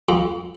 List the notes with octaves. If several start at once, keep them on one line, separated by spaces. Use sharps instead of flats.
F2